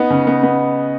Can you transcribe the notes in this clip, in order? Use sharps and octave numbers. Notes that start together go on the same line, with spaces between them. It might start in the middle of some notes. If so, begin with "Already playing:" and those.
Already playing: B3 D#4
C#3
B3
B3